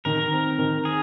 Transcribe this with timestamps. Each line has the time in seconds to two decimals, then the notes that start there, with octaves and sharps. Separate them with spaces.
0.05 D#3 A#4
0.32 C4
0.59 D#3
0.85 G#4